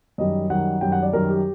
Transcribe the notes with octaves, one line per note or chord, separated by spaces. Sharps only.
F#2 D#3 G3 D#5
F#2 D#3 G3 F#5
F#2 D#3 G3 G5
F#5
D5
F#2 D#3 G3 A#4
G4